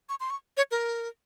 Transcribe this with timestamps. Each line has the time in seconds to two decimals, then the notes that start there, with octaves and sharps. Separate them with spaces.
0.09 C#6
0.20 C6
0.30 C#6
0.57 C#5
0.71 A#4